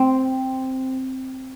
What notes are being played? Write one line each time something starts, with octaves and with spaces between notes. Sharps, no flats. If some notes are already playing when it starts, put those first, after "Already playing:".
Already playing: C4